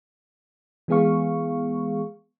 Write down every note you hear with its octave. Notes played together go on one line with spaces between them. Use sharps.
E3 G#3 B3 G#4 F5 C#6